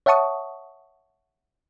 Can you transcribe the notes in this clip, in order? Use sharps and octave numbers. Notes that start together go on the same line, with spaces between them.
C#5 E5 F#5 A5 C#6 D#6